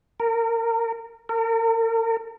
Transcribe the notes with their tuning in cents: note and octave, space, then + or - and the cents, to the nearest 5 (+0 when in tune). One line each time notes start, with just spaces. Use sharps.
A#4 -25
A#4 -40